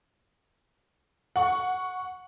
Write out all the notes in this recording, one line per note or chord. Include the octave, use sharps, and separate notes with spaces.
F#5 C#6